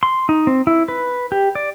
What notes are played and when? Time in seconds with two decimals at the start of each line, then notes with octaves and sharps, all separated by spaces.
0.03 C6
0.29 D#4
0.47 C4
0.67 E4
0.88 B4
1.32 G4
1.55 D5